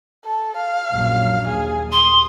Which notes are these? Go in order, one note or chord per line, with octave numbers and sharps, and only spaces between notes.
A4
F5
A#1 F#2 F#3
D#2 G#4
C6 D#6